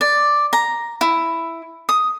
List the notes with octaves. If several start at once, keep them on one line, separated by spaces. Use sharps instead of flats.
D5
A#5
E4
D#6